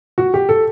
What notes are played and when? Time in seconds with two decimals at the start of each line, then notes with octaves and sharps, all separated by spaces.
0.18 F#4
0.34 G4
0.49 A4